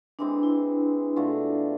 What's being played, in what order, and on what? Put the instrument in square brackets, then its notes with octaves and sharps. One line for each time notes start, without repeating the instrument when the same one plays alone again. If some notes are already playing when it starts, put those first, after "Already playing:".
[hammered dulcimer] E3 G#3 C4 [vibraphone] D4
[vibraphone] E4
[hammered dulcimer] B2 A3 D4 F4